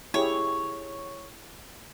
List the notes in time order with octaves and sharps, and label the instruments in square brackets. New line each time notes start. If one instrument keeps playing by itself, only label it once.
[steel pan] E4 G4 G#4 [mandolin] C#5